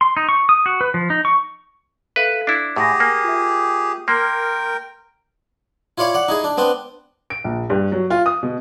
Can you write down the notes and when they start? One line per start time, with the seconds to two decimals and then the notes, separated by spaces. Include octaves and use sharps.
0.01 C6
0.17 D#4
0.29 C#6
0.49 D#6
0.66 F#4
0.81 B4
0.94 F3
1.10 D#4
1.25 C#6
2.16 A4 B4 E5 F5
2.47 D4 E4 D6
2.76 A2 G4 G#4 F#5 G#5 A#6
3.00 A#3
3.24 F4 E5
4.08 A#3 A#4 G5 C6 F6
5.98 E4 F4 C#5 D5 F5
6.14 D5 F#5
6.28 D#4 E4 G#4
6.44 D4
6.58 B3 C4 D4 G5
7.30 D7
7.44 A#1
7.70 G2
7.92 F#3
8.10 F4
8.26 D#6
8.43 B2